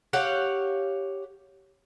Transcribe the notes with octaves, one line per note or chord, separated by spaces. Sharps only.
G4 C#5 F5 F#5